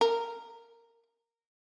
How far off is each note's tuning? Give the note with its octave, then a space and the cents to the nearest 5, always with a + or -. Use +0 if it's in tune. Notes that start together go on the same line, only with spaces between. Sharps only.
A#4 -10